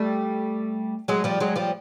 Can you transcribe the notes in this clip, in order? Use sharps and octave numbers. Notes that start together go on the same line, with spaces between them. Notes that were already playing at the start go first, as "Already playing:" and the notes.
Already playing: G3 A3
F#3 G#3
F3 G3
F#3 G#3
F3 G3